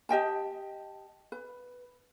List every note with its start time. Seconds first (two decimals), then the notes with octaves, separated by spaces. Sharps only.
0.09 G4 D#5 G5 A5
1.32 B4